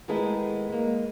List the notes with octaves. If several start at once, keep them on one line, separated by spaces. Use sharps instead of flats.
D#3 G#3 A3 B3 E4 G#4
G#3 A#3